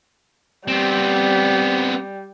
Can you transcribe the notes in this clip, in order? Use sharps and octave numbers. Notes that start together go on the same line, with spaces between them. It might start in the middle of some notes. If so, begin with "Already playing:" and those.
G3 B3 C4